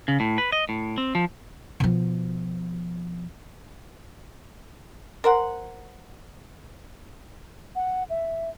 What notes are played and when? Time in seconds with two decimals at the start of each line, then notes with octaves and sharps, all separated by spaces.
0.08 C#3
0.20 A2
0.38 B4
0.52 D#5
0.69 A2
0.98 C4
1.15 F3
1.80 B2 F3
5.24 A#4 C5 F#5
7.75 F#5
8.10 E5